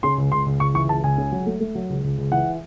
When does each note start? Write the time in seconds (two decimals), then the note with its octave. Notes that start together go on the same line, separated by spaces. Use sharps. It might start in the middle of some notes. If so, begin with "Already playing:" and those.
0.03 C#3 C6
0.18 C#2
0.32 C#2 C6
0.46 C#2
0.60 C#2 C#6
0.74 E3 C#6
0.89 C#2 A5
1.03 C#2 G#5
1.18 C#3
1.32 F#3
1.46 A3
1.60 A3
1.75 F#3
1.90 C#2
2.04 C#2
2.18 C#2
2.32 E3 F#5